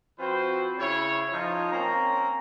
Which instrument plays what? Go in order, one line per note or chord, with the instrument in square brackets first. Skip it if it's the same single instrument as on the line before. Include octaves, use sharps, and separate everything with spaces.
[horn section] F3 C4 F#4 B4 C5
C#3 E4 C#5
F3 D#4
A#3 C4 C#4 A#5